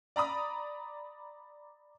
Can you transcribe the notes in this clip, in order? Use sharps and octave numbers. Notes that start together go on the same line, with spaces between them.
D5 A#5 B5 D#6